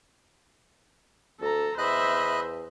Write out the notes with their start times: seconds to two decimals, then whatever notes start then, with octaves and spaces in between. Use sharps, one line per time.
1.41 D2 A4 A#5
1.78 E2 C5 D#5 E5 B5 F#6